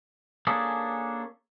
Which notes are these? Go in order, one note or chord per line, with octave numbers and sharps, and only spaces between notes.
A#3 C#4 D4 G#4 A4